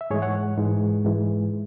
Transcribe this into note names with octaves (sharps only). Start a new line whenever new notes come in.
E5
G#2 E3 G#3 G#4 C#5
C#5 F#5
G#2 E3 G#3
G#2 E3 G#3